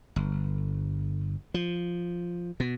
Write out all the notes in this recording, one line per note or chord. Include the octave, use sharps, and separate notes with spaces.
G1
F3
B2